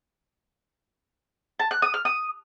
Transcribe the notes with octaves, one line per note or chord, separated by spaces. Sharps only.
A5
F#6
D#6
F6
D#6